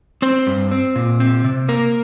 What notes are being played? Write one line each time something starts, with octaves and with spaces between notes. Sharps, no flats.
C4 C5
G2
C4
A#2
C4
C3
A#3 A#4